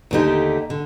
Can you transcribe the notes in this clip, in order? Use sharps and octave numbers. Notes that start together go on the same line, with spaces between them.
D#2 D3 A3 D#4 G4
D3